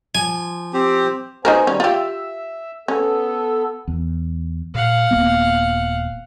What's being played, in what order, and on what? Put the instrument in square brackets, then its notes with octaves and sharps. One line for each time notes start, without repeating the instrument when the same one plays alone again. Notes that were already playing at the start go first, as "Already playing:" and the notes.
[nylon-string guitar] F3 [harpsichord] G#5
[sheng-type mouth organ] C4 G4 C5
[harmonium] B3 C5 G#5 [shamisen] D#4 F#4 A#4
[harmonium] D#3 G3 [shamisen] C#4
[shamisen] F4 G4 [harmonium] E5
[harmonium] B3 A4 [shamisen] C#4
[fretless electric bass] E2
[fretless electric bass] A#2 [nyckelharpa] F5 F#5
[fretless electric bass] D#1 A#3 B3